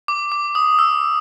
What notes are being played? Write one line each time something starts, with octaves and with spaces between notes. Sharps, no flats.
D6
D6
D#6
E6